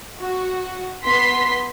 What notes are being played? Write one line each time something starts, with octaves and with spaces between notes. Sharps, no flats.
F#4
B3 C6 B6